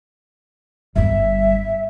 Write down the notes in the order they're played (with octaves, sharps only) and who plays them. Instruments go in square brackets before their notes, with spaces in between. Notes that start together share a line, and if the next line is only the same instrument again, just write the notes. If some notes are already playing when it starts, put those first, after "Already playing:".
[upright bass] G1 G2 [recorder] E5